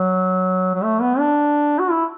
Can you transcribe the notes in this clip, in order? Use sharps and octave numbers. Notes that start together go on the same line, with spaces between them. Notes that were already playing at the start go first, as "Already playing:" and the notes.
Already playing: F#3
F#3
A3
B3
D4
F#4
E4